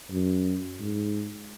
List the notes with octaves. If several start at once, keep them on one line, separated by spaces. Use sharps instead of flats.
F#2
G#2